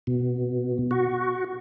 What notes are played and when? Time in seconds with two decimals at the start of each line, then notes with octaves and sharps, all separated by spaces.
0.07 B2
0.91 F#4